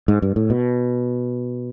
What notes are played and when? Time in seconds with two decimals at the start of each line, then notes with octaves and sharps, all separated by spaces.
0.08 G#2
0.22 G2
0.36 A2
0.50 B2